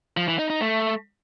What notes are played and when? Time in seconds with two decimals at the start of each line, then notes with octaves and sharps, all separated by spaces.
0.17 F3
0.28 E3
0.39 D#4
0.50 D#4
0.61 A3